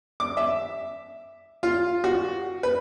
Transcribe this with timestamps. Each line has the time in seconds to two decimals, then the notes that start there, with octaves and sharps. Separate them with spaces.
0.20 D6
0.37 E5
1.63 F4
2.04 F#4
2.63 B4